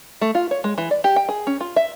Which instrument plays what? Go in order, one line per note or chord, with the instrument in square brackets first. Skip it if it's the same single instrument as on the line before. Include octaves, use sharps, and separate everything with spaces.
[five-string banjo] A3
F4
C#5
G#3
E3
D5
G4
G5
G#4
C#4
F4
E5